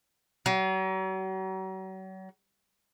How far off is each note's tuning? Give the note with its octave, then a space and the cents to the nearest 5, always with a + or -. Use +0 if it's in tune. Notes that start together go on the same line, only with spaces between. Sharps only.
F#3 +40